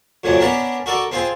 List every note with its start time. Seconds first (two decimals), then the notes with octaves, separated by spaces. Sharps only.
0.24 F2 A#2 C#3 F#3 D4
0.40 B3 C#4 D4 A#4 F#5 A5
0.86 F#4 A4 A#4 D5 C#6
1.12 C4 F4 G#4 C5 A5